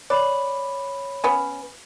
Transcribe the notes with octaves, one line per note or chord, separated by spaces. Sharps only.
C#5 D5 B5
B3 C#4